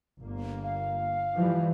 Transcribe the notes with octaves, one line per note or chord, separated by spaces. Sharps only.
G1 A#3
F5
E3 F3 G3